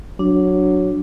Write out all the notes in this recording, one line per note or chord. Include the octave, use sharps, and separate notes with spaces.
F#3 D4